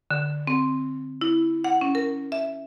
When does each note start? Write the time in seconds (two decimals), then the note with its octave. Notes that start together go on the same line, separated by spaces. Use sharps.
0.11 D3
0.47 C4
1.21 E4
1.64 F#5
1.81 C#4
1.95 A#4
2.32 E5